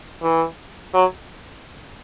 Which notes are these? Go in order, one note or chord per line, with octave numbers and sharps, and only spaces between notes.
E3
F#3